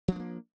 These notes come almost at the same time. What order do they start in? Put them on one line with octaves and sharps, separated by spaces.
F3 D4 A3 A#3